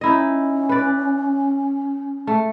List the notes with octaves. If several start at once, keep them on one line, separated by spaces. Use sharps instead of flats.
C#4 D#4 E4 D#5
B4 D5
A3